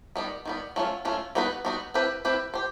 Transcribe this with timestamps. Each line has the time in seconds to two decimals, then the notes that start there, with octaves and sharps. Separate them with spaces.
0.16 D#3 G3 B3
0.45 D#3 G3 B3
0.76 F#3 A3 C#4 F4
1.05 F#3 A3 C#4 F4
1.35 G3 B3 D#4 F#4 B4
1.65 G3 B3 D#4 F#4 B4
1.94 C4 E4 G4 B4
2.25 C4 E4 G4 B4
2.54 G4 C5